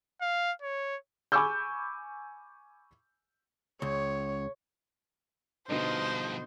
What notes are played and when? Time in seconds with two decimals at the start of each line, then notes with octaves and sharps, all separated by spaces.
0.21 F5
0.62 C#5
1.32 G#5 B5 C#6 D6 E6 G6
3.82 C#2 C#5
5.70 G2 B2 D3 F3 D#4 B4 C5